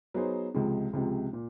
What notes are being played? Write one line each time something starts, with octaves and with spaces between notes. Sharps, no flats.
F#3 B3 D#4 G#4 C5
C#2 C3 F3 G#3
C#2 C3 F3 G#3
A#2